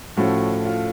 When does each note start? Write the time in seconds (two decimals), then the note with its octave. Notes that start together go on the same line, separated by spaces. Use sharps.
0.17 A2 F3 A3 C#4 F#4
0.65 F4